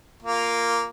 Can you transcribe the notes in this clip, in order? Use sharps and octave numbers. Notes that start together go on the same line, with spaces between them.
A#3 F4